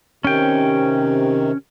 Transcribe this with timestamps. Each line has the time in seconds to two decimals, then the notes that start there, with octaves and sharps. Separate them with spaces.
0.24 C3 D#3 C#4 G5